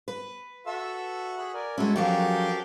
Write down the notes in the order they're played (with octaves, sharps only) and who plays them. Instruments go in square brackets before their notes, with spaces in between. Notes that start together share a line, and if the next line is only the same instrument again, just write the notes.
[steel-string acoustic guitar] B4
[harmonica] F#4 [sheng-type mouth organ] A4 E5 E6
[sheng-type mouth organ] G#4 B5 F#6
A#4 D5 G#5
[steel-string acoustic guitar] G#3 C#4 [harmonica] E4 [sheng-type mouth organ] F#4 A4
[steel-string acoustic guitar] F3 F#3 C#4 [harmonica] G4 G#4 A#4